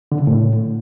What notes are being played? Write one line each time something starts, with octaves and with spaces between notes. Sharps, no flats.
D3
C#3
A2